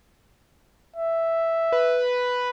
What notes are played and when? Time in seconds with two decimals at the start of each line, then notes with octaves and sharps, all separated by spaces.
0.96 E5
1.72 B4